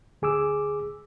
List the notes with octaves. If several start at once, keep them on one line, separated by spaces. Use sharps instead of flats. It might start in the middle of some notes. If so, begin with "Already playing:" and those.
D2 G#4 D6 E6